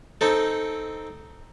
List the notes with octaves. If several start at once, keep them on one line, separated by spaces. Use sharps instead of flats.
C4 D#4 A4